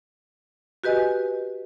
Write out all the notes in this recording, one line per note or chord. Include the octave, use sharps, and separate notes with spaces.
F#4 G4 B4 D#5 G#5